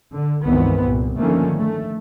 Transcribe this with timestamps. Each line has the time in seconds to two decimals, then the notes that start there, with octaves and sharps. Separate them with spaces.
0.11 D3
0.44 G1 C#2 D#3 E3 B3 C4
0.82 C2 A#2
1.18 D3 D#3 F3 A3 A#3 C#4
1.56 A3